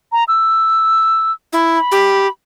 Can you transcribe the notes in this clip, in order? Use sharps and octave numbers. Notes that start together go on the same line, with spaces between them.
A#5
E6
E4
B5
G4